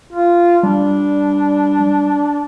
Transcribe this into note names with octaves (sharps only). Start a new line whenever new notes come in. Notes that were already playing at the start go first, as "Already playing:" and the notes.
F4
G3 D4